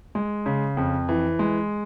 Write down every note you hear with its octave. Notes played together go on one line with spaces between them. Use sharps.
G#3
C#3
F2
E3
G#3